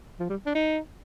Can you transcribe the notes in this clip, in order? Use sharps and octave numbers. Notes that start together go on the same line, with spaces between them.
F3
G3
D4
D#4